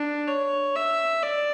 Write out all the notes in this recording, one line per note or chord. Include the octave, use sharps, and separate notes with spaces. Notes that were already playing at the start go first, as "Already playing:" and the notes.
Already playing: D4
C#5
E5
D5